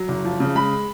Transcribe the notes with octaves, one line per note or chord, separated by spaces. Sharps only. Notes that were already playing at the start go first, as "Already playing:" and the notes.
Already playing: F#3
F#1
F3
C#3
G#3 B5